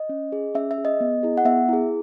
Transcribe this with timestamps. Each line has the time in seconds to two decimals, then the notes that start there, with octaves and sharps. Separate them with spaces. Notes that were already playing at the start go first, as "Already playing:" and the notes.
Already playing: D#5
0.09 C#4
0.32 G#4
0.55 C#4 E5
0.71 E5
0.78 G#4
0.85 D#5
1.00 B3
1.23 E4 G#4
1.37 F#5
1.45 B3 E5
1.69 E4 G#4